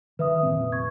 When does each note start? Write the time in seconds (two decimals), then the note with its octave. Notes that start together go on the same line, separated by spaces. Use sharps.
0.19 D#3 B4 E5 D#6
0.43 F1 A#2 C4
0.72 C#6 G#6